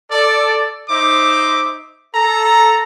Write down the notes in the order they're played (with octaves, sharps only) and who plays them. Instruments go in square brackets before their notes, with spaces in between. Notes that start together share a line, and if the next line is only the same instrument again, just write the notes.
[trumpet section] A4 D5
D#4 C5 E5 D6
A4 A#5